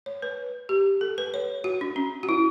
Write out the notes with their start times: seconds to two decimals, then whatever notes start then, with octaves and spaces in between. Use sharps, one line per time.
0.06 C#5
0.22 B4
0.69 G4
1.01 A4
1.18 B4
1.34 C#5
1.64 F#4
1.81 D4
1.96 C#4
2.23 F#4
2.29 E4